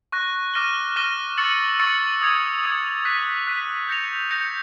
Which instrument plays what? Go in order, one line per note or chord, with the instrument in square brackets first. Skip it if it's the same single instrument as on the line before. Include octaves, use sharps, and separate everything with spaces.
[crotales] C#6 F#6 A#6
D6 F6 A#6 D#7 G7
D6 F6 A#6 D#7 G7
C#6 E6 A6 C#7 F#7
C#6 E6 A6 C#7 F#7
D#6 G#6 C#7 F7
D#6 G#6 C#7 F7
F#6 B6 D#7
F#6 B6 D#7
G6 A#6 C#7 F7
G6 A#6 C#7 F7